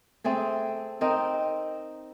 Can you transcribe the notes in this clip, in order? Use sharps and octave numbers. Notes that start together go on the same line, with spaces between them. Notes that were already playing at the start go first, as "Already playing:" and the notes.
A3 C4 G#4 A4
C4 D#4 A#4 C5